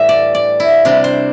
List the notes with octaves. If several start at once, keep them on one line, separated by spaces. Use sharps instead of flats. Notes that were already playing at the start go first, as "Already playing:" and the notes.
Already playing: A2 E3 G3 E5
D5
D5
E4
C3 G3 D4
C5